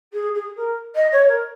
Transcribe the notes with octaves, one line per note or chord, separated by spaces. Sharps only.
G#4
G#4
A#4
D#5
C#5
A#4